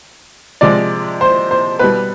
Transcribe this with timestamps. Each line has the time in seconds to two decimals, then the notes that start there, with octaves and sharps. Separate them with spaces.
0.61 C3 F3 G#3 D5
1.21 C5
1.51 C5
1.79 B2 G3 B4